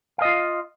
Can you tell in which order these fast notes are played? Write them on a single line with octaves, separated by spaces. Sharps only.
F5 D#5 F4